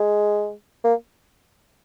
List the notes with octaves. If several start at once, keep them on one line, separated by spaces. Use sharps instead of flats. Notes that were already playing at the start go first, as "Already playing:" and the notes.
Already playing: G#3
A#3